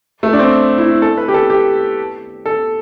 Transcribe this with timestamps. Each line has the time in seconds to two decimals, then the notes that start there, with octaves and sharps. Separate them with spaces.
0.23 A3
0.33 D4
0.39 C4
0.78 E4
1.02 A4
1.17 B4
1.28 G4
1.34 A4
1.50 G4
2.46 A4